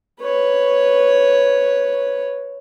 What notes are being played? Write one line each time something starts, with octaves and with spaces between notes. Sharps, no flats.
B4 C#5